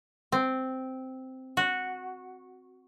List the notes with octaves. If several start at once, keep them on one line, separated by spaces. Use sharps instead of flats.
C4
F#4